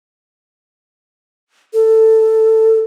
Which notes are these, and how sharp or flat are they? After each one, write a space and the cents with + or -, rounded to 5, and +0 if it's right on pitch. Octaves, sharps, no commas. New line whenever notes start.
A4 +10